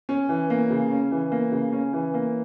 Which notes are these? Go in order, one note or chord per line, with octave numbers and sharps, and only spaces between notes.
C#4
E3
A#3
C#3
C#4
E3
A#3
C#3
C#4
E3
A#3